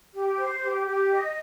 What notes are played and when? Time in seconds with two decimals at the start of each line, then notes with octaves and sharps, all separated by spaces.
0.14 G4
0.38 C5
0.62 G4
0.86 G4
1.11 D#5